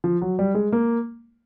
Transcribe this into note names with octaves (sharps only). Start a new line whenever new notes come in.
F3
F#3
G3
G#3
A#3